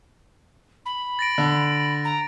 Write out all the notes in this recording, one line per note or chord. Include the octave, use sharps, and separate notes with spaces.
B5
A6 A#6 D7
D3
A#5